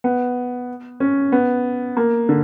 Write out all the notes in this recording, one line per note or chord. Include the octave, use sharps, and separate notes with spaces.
B3
C#4
B3
A#3
D3